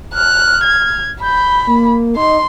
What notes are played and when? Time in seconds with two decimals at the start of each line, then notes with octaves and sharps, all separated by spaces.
0.14 F6 F#6
0.64 G#6
1.22 B5 G6
1.67 A#3
2.16 D#4 C6